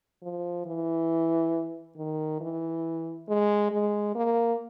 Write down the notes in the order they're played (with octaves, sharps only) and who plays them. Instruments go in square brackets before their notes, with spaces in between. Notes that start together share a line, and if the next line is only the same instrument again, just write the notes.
[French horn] F3
E3
D#3
E3
G#3
G#3
A#3